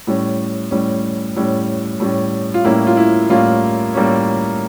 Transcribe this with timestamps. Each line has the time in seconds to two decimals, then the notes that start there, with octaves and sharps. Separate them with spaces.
0.07 A2 G3 C#4
0.71 A2 G3 C#4
1.36 A2 G3 C#4
2.00 A2 G3 C#4
2.54 F4
2.64 A2 G3 A#3 C#4 E4
2.87 F4
2.97 E4
3.30 A2 G3 A#3 C#4 F4
3.94 A2 G3 A#3 C#4